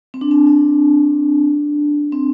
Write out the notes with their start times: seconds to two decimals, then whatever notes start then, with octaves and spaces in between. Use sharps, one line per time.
0.14 C4
0.21 D4
0.31 C4
0.47 D4
2.12 C4